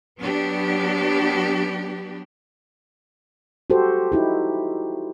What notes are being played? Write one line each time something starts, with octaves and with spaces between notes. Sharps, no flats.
F#3 B3 D4 G4
F#4 G4 A4 C5
D#4 E4 G4